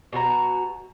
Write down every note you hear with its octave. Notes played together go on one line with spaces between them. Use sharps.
B2 F#4 A4 A#5